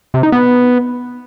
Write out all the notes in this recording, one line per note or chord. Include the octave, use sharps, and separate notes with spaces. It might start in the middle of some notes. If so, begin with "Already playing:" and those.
C3
D#4
B3